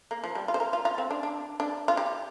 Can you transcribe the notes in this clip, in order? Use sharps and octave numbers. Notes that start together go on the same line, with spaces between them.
A#3
F3
G3
F4
C5
A#4
F4
F4
C4
D4
D4
D4
F4
G4